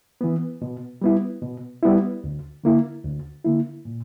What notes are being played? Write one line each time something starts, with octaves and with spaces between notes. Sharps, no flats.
E3 B3
B2
G3 B3 E4
B2
G3 B3 E4
D2
D3 A#3 E4
D2
D3 A#3 E4
A#2